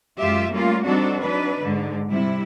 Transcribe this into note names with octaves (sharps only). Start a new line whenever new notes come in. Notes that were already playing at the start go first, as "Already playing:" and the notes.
F#2 G#3 F4 G4 E5
G3 A3 A#3 C#4 F4
G3 C4 D4 D#4 F#4 A4
F#3 D4 D#4 B4
G#2 D3
C3 G3 E4